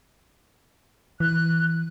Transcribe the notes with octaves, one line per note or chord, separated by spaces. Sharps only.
E3 F#6